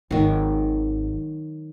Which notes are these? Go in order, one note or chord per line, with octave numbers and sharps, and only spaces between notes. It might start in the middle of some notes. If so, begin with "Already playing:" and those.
G#1 D#3 F#3